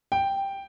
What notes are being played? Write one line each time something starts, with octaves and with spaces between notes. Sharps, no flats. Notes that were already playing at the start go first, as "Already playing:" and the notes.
G5